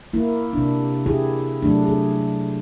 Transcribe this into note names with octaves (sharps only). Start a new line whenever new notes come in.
A#3 E4
C3 D4
E4 G4 G#4
C3 F#3 A3 D4
G#4